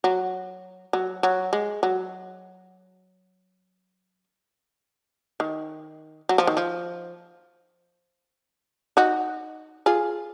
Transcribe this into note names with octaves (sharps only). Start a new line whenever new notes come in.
F#3
F#3
F#3
G#3
F#3
D#3
F#3
F3
D#3
F3
D#4 F#4
F4 G#4